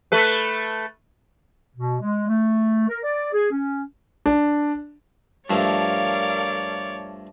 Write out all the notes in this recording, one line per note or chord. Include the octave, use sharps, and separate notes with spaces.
A3 A4 B4
B2
G#3
A3
A#4
D5
G#4
C#4
D4
G2 F3 A3 A#4 C#5 D5 F5